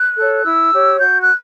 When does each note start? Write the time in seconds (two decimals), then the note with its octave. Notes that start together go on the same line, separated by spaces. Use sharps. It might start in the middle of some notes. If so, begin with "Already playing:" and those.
Already playing: F#6
0.16 A4
0.21 C#5
0.44 E4 E6
0.73 G4 C#5
1.00 F#4 G6
1.20 F#6